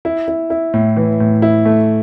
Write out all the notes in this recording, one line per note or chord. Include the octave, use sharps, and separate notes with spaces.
E4
E4
E4
A2
E3
A2
E4
A3